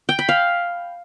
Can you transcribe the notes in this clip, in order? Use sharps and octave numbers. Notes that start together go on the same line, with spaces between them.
G5
B5
F5